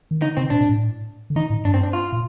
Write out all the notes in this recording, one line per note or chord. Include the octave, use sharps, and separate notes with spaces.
D#3
D3 D#4
C3 C4
A#2 D4
A#2
A2
D3
D#3 D#4
A2
G2 D4
C4
D4
F4
A#2